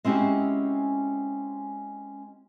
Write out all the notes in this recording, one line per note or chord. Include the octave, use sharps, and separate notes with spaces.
G#3 C4 C#4 E4 F#4 G4